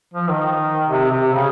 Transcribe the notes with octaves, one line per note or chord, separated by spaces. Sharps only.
F3
D#3
C3
C3
C#3